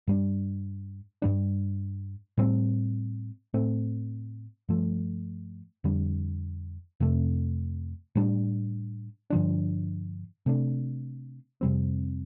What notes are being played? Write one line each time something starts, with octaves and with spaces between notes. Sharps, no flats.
G2 G3 D4
G2 G3 D4
A2 G3 C4
A2 A3 C4
G2 F3 A3
F2 D3 G3
F2 C3 A3
A2 G3 D4
G2 D3 F3 D4
C3 A3 D4
F2 C3 G3 C4